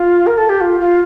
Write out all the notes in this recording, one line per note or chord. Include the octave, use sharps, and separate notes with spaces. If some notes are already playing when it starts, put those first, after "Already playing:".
Already playing: F4
A#4
A4
G4
F4
F4